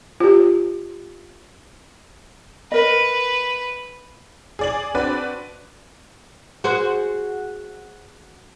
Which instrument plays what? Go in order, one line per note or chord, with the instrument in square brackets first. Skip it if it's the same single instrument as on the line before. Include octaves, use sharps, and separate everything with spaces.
[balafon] F4 G4
[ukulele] A#4 D#5 [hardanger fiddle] B4
[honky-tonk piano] G#4 D5 F#7
C4 D4 F#4 B4 D5
[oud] F#4 G#4 C5